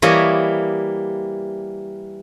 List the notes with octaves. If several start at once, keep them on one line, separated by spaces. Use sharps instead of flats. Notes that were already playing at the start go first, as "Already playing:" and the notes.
E3 G3 A#3 C#5 D#5 E5